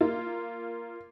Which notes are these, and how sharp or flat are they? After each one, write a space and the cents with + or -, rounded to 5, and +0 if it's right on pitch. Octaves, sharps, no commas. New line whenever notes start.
A#3 +0 F4 -15